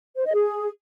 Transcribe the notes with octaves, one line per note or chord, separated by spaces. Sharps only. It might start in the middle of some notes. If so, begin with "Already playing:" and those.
C5
D#5
G#4